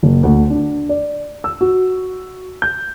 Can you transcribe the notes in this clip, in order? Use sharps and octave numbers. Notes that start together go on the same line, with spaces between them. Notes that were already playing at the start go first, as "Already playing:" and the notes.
F#1
D2
D4
D5
E6
F#4
G6